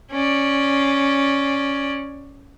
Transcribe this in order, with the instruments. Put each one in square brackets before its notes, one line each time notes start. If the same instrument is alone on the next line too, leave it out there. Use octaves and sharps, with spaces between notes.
[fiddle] C#4 D5